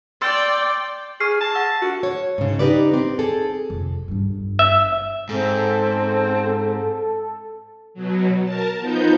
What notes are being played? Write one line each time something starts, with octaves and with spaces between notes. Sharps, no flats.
D5 G5 C6 E6 A6
G#4 C#6 F6 C7
A5
F#5 E6
F#4
C#5
G#2 C#3
D#4 G4 B4 D5
C4
G#4 A4
F2 C3
G1 G2
E5
G#2 C4 A4
B2 F#3
A#4 A5
F3 B3 D#4 G6